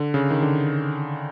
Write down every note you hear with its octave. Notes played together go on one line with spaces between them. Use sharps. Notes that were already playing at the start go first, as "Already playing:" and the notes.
Already playing: D3
C#3
D#3
D3